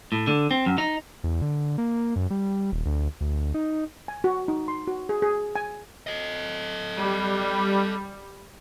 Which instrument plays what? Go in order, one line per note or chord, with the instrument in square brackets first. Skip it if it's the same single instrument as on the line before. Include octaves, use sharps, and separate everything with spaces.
[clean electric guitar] A2
D3
C4
F#2
D#4
[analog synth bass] E2
D3
A#3
F#2
G3
D#1
D2
D2
D#4
[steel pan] G#5
F#4
D#4
C6
F#4
G#4
G#4
G#5
[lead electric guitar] A4 D#5
[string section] G3